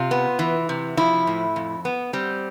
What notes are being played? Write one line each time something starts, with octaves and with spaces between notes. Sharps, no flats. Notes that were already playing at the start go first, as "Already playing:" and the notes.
Already playing: C3 F4
B3
E3
C3
F3 E4
A2
F2
B3
G3 C4